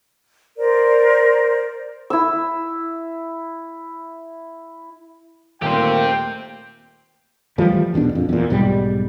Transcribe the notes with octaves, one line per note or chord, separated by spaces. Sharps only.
A#4 C5 D5
E4 E6
D#1 A3 A#3 G4 C5 G5
E3 F3 G3 A3
A#1 E2 B2 D4
F#1 F2
E2 A#2
B1 G#2 B2 G3